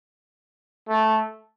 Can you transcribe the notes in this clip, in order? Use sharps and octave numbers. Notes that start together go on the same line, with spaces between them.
A3